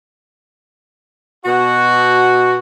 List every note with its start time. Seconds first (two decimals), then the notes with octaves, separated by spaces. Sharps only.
1.45 B2 F#4